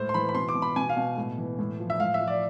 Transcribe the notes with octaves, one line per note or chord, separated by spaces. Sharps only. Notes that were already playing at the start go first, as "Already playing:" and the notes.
Already playing: A2 C5
C6
E3 B5
B5
B2 C6
D6
B2
B5
B2 G#5
F5
B2
A2
E3
A2
F3
E5
A2 F5
E5
F3
D5